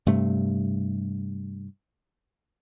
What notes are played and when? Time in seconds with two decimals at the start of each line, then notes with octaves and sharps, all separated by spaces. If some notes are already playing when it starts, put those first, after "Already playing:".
0.06 G2 C3 A3